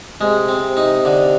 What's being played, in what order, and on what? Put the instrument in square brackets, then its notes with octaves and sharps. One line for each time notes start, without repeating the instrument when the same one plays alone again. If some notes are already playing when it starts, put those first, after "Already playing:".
[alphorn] C3 [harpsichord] G#3
[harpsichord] C4
[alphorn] C3
[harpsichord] D#4
D3